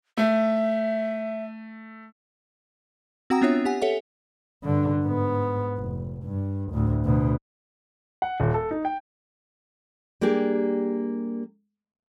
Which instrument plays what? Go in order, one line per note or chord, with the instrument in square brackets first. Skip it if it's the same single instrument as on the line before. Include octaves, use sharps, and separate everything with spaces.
[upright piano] A3 [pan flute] E5
[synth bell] C4 F#4 F#5 G5 A#5 D#6
B3 C4 D4 F4 C#5 E5
G4 F#5 G#5
G4 A4 C#5 E5 F#5
[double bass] G2 D3
G#2 B3
F1
G2
D2 A2
D2 B2
[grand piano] F#5
D#1
A4
D#4
G5
[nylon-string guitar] G3 A#3 D4 G4 G#4